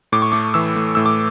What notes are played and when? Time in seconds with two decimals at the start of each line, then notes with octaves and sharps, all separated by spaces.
0.12 A2 D6
0.22 C#6
0.32 A3 D6
0.54 E3 E6
0.76 A3
0.95 A2 E6
1.06 D6